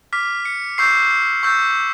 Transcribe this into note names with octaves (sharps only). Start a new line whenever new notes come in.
D6 F6 B6
C#7
C#6 E6 G6 C7
C#6 E6 G6